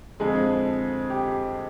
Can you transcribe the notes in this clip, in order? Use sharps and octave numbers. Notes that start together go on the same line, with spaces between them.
F2 D3 F3 G#3 G#4
G4